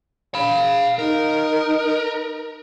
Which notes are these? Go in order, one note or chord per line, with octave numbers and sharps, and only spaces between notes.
F5 B5
D#4 A#4